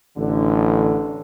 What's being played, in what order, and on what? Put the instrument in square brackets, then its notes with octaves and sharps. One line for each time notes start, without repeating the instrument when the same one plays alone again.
[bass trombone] A1 [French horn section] D3